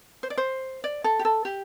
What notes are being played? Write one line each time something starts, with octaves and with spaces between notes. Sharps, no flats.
C5
D5
C5
D5
A4
G4
A4
G4